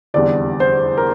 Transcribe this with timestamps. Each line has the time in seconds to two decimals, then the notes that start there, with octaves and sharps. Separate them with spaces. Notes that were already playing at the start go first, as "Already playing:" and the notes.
0.14 F1 E2 D3 G3 D5
0.60 C5
0.97 A#4